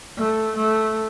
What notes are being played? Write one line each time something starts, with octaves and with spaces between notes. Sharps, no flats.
A3
A3